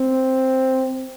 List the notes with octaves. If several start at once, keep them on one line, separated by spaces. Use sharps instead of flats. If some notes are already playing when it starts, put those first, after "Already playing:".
Already playing: C4